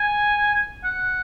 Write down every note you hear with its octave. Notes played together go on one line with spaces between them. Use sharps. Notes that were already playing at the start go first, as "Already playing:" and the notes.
Already playing: G#5
F#5